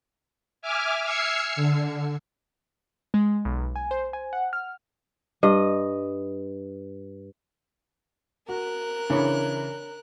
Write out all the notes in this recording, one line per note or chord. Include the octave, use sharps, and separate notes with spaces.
E5 G#5 D6 F6
E6 F6 G#6 C7 C#7
D3
G#3
B1
G#5
C5
G#5
F#5
F6
G2 D#5
F#4 A#4 F#6
C#3 E3 D4 C#5 B5